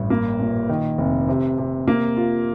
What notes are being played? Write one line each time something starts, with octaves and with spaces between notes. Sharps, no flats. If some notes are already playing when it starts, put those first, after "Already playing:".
Already playing: A1 G2
A#3
A#2
D#3
F1
C3
C3
A#3
F4